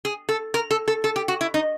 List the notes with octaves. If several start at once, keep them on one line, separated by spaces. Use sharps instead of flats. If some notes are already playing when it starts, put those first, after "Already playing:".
G#4
A4
A#4
A4
A4
A4
G4
F#4
E4
D#4